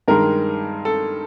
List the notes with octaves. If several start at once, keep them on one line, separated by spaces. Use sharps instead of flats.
G2 D#3 G#3 A#4
A4